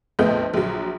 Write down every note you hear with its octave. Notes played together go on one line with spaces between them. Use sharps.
A#1 F2 A3 B3 D#5 G6
A#1 F#3